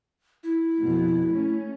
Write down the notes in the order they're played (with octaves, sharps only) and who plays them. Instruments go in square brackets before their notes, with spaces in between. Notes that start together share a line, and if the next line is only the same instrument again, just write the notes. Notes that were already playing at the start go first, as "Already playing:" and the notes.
[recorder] E4
[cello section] F2 B2
A3 C#4